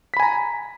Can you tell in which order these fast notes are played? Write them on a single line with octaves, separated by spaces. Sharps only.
B6 B5 G#5 A#5